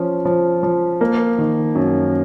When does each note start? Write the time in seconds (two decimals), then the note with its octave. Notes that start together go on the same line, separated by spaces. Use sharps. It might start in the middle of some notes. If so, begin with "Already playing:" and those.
Already playing: F3 C#4
0.25 F3
0.63 F3
1.01 A#3
1.38 D#3
1.75 F#2